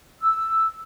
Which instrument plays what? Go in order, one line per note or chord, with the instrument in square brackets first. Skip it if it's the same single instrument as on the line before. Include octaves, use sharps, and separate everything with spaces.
[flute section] E6